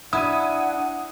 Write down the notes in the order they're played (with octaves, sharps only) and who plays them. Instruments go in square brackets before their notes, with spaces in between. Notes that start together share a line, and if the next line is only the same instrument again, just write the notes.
[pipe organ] D4 [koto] E4 [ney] F#5 [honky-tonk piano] D#6 G#6 D#7